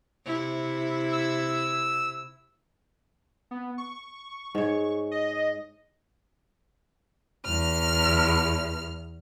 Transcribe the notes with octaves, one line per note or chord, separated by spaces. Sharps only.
C3 E4
E6
B3
C#6
G#2 C#5
D#5
E2 F6